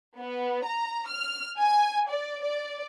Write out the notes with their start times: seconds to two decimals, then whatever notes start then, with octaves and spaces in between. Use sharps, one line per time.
0.19 B3
0.66 A#5
1.08 F6
1.59 G#5
2.10 D5
2.44 D5